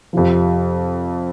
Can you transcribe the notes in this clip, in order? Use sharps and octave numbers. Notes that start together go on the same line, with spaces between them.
F2 C3 F3